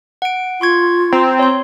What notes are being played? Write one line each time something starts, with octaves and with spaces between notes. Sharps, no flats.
F#5 D7
F4 C6 C#6 G#6
C4 A#5
C#5 C6